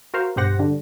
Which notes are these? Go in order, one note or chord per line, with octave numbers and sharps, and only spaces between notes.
F#4 A#4 C5 F5
B1 G2 G4 C5 F#5 A#6
D3 G3 D4